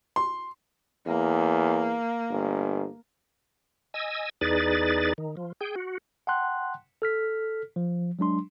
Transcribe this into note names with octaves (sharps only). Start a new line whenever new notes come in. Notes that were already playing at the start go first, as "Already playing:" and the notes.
C6
E2 A#3
G1
D#5 G#5 E6
E2 D#4 G#4 B4 D5 A6
D#3
F3
G#4 G5
F#4
F#5 G5 A5 C6 F#6
A4 F6 B6
F3
F#3 G#3 D4 C6